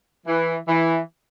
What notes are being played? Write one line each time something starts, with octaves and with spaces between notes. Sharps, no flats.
E3
E3